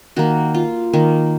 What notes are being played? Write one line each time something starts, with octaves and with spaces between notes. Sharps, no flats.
D#3 A#3 F#4
F4
D#3 A#3